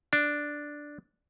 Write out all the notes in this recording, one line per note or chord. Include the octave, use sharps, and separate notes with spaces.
D4